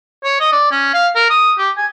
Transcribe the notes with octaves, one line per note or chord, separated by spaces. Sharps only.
C#5
D#5
D5
C#4
F5
A#4
D#6
G4
G#5